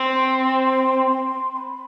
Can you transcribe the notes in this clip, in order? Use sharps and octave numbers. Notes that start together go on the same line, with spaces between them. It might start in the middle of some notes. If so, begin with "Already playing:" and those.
Already playing: C4 C6
B5